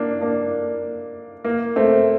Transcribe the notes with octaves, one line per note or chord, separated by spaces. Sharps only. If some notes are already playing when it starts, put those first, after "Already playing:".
Already playing: A#3 D4
A#3 D4
A#3
A3 C4